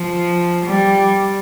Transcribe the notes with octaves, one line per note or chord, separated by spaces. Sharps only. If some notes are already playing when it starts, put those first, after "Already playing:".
Already playing: F3
G3